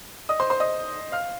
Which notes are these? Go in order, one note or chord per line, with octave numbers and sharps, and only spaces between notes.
D#5 D#6
C5 C6
C5 C6
D#5 D#6
F5 F6